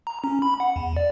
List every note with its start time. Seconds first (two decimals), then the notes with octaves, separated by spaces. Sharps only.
0.07 A#5
0.24 C#4
0.42 B5
0.60 F#5
0.76 E2
0.97 D5